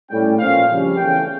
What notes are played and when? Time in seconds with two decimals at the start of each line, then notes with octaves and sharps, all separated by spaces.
0.11 A2 G3 C#4 G5
0.39 A#2 F3 C#4 F5
0.69 F2 C#3 G3 C#4
0.98 E2 E3 A3 C#4 G5